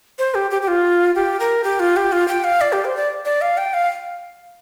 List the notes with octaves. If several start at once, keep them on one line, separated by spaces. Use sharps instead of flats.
C5
G4
G4
G4
F4
G4
A#4
G4
F4
G4
F4
G5
F5
D5
G4
C5
D5
D5
F5
G5
F5